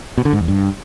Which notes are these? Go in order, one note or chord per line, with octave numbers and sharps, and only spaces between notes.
B2
D3
G#2
E2
G2